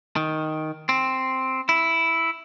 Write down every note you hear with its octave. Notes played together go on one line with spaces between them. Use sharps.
D#3
C4
E4